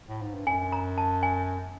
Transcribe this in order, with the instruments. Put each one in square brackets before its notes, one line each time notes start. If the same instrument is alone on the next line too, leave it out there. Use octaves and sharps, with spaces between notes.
[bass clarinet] A2
G#2
G2
[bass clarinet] F#2 [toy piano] G#5
[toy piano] A#5
A5
G#5